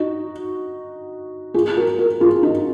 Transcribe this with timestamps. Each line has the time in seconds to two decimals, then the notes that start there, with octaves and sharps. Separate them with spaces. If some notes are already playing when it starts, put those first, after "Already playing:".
Already playing: D#4 F#4
1.54 F4 G#4
1.77 F#4 A#4
1.98 F#4 A#4
2.20 F4 G#4
2.43 D#4 F#4